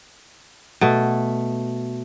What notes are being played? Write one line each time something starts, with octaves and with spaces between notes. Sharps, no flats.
B2 A3